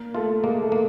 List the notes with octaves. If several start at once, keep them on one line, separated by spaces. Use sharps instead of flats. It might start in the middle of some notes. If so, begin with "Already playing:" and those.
Already playing: A#3
A3 F4
G#3 A#3
A3
A#3